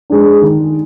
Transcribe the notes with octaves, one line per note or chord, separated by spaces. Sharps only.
G#3 D4
D#3